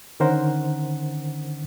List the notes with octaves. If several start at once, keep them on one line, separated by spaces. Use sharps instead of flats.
D3 D#3 C#4 A#4 C5 F#5